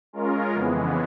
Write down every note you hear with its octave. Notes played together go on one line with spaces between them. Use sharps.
G#3 C#4 F4 A#4
F2 C#3 E3 G#3 B3